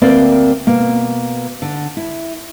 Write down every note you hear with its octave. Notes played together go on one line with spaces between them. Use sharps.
D2 A#3 C4 A#4 B4 D5
B2 A#3
D3
E4